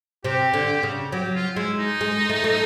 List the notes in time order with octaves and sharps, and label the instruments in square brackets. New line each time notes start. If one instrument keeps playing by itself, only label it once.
[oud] C3 [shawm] G4
[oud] D3
C#3
[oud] F#3 [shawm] G4
[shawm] F4
[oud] G#3 [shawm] E4
[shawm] D#4
[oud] G#3
A3
A3